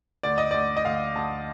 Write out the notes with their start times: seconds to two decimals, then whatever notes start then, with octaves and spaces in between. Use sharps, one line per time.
0.23 D2 D5
0.38 D#5
0.51 D2 D5
0.77 D#5
0.84 D2 F5
1.16 D2 A5